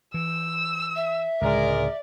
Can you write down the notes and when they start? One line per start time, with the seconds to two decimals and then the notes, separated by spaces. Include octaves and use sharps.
0.14 E3 E6
0.96 E5
1.42 C#2 A2 D3 G#3 A#4 D5